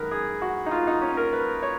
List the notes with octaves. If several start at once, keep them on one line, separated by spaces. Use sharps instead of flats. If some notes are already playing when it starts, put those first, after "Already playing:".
Already playing: F#2 D#3 G#3 A#4 B4
G#4
F#4
D#4
F4
D#4
C#4
A#4
B4
C#5